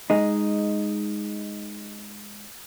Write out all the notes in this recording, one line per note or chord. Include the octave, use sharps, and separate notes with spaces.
G#3 D#4